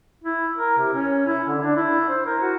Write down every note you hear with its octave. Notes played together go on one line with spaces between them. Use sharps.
E4
A#4
C3
C#4
E4
D3
D4
E4
C5
A#4
F#4